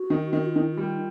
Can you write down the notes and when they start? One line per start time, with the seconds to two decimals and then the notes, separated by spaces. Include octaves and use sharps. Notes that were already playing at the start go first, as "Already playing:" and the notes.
Already playing: F#4
0.10 D#3
0.33 D#3 F#4
0.45 F4
0.56 D#3 E4
0.70 F4
0.77 G3